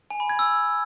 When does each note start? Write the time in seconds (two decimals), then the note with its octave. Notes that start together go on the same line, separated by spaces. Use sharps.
0.11 G#5
0.20 B5
0.29 G#6
0.39 E6